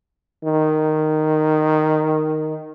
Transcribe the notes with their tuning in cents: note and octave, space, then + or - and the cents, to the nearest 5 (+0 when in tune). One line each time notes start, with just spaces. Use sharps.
D#3 -5